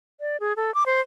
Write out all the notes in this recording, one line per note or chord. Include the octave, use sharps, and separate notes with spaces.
D5
G#4
A4
D6
C5